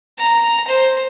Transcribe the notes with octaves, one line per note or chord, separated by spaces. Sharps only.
A#5
C5